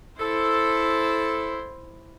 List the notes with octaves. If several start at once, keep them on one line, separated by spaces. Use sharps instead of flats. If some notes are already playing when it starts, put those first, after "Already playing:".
E4 A4 C5